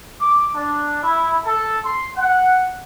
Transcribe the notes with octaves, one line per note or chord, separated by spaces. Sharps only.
D6
D4
E4
A4
C6
F#5